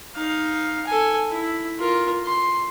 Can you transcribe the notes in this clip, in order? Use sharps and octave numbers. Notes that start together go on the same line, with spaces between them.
D#4 F5
A4 G#5
E4
F4 A#4
C6